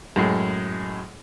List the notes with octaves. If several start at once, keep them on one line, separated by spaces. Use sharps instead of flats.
F#2 A2 G#3